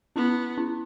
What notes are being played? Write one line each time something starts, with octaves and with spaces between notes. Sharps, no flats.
B3 C#4 E4
C#4 E4